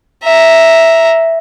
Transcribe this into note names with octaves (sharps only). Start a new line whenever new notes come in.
E5 A#5